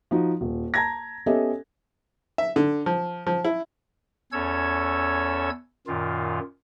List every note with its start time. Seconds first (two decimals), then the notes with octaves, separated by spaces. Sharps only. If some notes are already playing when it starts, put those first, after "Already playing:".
0.11 F3 D#4 F#4
0.41 D#1
0.74 A5 A#5 G#6 A#6
1.26 B3 C#4 G4 A4 D#5 E5
2.38 E5
2.56 D3
2.86 F3
3.27 F3
3.45 E4
4.32 E2 C#4 A4 C#5 E6 G#6
5.87 F#2 A#2 D#3 F4